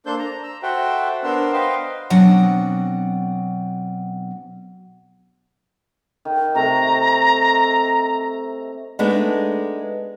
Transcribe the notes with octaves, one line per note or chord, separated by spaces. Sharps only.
A#3 D4 A4 C5 G6
A#5
A#5 E6
F#4 A4 C5 E5 F#5 G5
B3 D4 A#4 C5 E6
B4 C5 D#5 F5 G5 C6
B2 F#3 C4 D4 F#5
D#3
C3 A3 A#5
G#3 A3 B3 D4 D#4